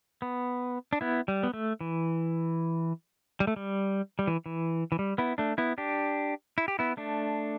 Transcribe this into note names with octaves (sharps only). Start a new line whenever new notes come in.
B3
D4
B3 E4
G3
B3
A3
E3
G3
A3
G3
G3
E3
E3
E3
G3
B3 E4
A3 D4
B3 E4
D4 G4
E4
G4
B3 E4
A3 D4